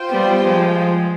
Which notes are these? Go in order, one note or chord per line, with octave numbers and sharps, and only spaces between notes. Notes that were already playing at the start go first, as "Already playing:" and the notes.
Already playing: F4 C5 G5
G3 B3
F3 G#3